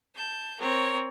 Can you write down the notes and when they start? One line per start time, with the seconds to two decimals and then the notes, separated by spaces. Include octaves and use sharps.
0.16 A5 G6
0.59 C4 A#4 C#5